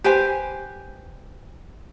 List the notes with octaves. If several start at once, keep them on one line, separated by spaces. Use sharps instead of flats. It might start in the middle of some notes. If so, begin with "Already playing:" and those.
G4 B4 C5 G#5